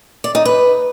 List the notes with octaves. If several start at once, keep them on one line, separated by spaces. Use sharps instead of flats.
D5
D#4
B4